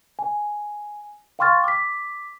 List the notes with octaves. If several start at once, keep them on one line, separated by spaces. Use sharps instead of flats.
G#5
F5 G5 C6 C#6 F6 A6
D6 B6